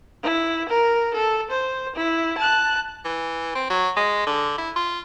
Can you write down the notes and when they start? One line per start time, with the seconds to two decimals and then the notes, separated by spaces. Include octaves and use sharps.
0.23 E4
0.69 A#4
1.15 A4
1.50 C5
1.96 E4
2.38 A5 F#6
3.05 E3
3.55 C4
3.70 F#3
3.97 G#3
4.26 D3
4.58 E4
4.76 F4